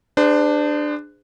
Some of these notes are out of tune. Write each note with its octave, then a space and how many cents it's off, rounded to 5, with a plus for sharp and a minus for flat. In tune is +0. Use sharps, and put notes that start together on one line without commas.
D4 +15 G#4 -20 C5 -35